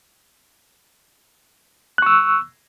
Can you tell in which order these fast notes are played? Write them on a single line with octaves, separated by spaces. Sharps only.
F#6 C#6 E6